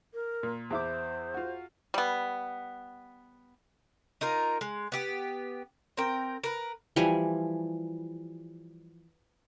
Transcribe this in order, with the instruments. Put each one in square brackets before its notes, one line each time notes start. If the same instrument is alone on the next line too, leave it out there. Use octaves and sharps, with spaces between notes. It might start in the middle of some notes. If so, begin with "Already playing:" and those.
[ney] A#4
[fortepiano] A#2
[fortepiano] E2 E4 D6 [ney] C5
[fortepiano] F4 F#4
[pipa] G3 B3
[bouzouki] D#4 F4 A#4
G#3
B3 G4
C4 A#4 G5
A#4 B4
[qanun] E3 F3 G3 G#5